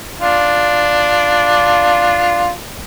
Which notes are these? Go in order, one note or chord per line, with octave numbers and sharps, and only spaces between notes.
D4 F4